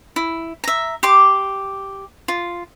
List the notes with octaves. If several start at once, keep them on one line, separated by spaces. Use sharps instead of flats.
E4
E5 A#5
G4 C6 D6
F4